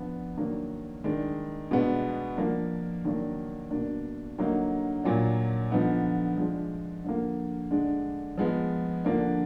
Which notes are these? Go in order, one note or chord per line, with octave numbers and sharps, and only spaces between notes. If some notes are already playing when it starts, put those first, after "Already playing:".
Already playing: F3 B3 D4
D#3 F#3 A#3 D4
D#3 G#3 D4
B2 G#3 B3 D4
F3 A#3 D4
D#3 F#3 A#3 D4
B2 A#3 D4
D3 F#3 A#3 D#4
A#2 F#3 D4
D3 F3 B3 D#4
F3 G#3 D4
D3 F3 A#3
D3 G#3 D4
F3 G#3 B3
D3 F3 A#3 D4